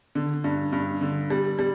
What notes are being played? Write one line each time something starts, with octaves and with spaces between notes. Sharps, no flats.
D3
G2
G2
D3
G3
G3